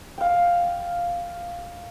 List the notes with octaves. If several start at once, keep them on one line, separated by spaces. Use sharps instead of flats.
F5 G5